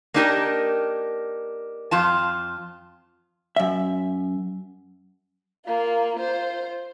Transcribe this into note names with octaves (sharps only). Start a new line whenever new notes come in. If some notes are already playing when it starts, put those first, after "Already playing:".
A#3 D4 D#4 G4 G#4 A#4
F2 F4 A5
F#2 E5
A#3 F4
F4 C5